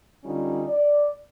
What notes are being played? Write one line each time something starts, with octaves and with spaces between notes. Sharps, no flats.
D3 G3 C#4 D#4 F4
D5